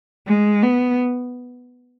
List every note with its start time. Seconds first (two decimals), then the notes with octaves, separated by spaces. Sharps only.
0.26 G#3
0.62 B3